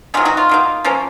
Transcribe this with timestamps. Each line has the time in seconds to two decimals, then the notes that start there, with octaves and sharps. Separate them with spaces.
0.14 D#3 F#3 B3 D#4 F4 G#4
0.25 D#4 F#4
0.37 F4
0.49 F#3 A#3 D#4
0.84 F3 A#3 C#4